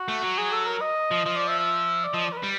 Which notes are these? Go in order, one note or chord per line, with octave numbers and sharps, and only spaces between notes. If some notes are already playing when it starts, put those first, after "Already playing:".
Already playing: F#4
A3
F#3
G#4
A4
A#4
D#5
F3
F3 D#5
D5
E5
E5
D5
F3 D#5
D5
A#4
B4
G3